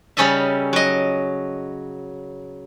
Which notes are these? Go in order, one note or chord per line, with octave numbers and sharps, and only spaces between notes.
C#3 G3 C#4 A4 D#5 E5
F#3 D#5